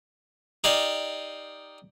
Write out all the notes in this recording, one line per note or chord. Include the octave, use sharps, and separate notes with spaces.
D#4 G4 D5 F5 G#5